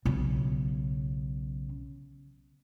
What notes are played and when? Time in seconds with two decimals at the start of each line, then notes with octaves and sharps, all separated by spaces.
0.05 B1 C#3